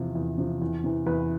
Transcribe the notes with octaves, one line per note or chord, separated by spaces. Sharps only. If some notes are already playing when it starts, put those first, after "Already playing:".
Already playing: E2 C3 F3
E2
C3 F3
E2
C3 E3
E2 B4